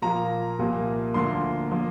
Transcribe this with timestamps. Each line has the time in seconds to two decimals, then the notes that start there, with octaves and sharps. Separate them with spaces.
0.02 A#2 F3 A#3 A#5
0.59 C2 A#2 F3 A#3
1.14 D2 D3 F3 A#3 C6
1.71 F3 A#3